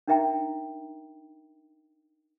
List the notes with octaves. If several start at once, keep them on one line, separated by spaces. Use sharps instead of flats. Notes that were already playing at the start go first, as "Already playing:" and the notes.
D4 D#4 A#4 E5 G5 A#5